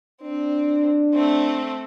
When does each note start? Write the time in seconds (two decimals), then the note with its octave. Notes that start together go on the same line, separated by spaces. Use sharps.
0.22 C4 D4
1.14 A3 C4